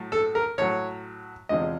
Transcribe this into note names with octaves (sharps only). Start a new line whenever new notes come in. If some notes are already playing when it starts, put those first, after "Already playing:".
Already playing: A2 F#3
A4
A#4
A2 F#3 C#5
E2 C3 F3 G#3 D#5